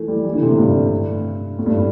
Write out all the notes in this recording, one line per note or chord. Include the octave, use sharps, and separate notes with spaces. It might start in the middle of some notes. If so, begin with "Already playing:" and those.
Already playing: E3 A3
G3
E3
D3
C3
A2
G2
A2
G2